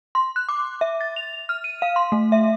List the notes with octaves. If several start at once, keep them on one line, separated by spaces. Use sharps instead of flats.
C6
F#6
D6
E5
A6
F7
F6
D#7
F5
C6
A3
E5